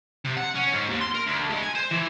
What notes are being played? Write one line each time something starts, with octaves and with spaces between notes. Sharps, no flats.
C3
F#5
C#4
G#2
D#2
C6
A#4
D2
G#3
G#5
C5
E3